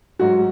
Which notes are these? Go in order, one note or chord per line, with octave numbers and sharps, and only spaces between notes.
G#2 F#3 F#4